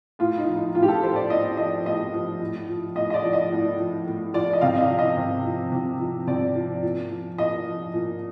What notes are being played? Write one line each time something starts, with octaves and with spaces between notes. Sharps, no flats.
A2 F4
D#4
F3
D#4
A2 F4
G4
A4
F3 C5
D5
A2 D#5
F3 D#5
A2 D#5
F3
A2
F3
A2 D#5
D#5
D5
F3
D#5
A2
F3
A2
F3 D5
D#5
C3 F5
D#5
F5
F3
D#5
C3
F3
C3
F3
C3 D5
F3
A#2
F3
A#2 D#5
F3
A#2